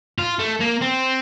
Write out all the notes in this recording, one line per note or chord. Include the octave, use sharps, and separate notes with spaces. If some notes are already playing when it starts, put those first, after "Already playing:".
F4
A3
A#3
C4